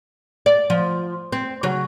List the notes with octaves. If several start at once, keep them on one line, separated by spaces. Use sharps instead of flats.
D5
F3
C4
C#3 F#3